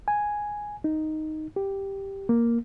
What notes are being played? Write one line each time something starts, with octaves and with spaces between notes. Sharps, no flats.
G#5
D#4
G4
A#3